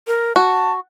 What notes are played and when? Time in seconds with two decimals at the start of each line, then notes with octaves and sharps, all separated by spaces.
0.07 A#4
0.36 F#4 A5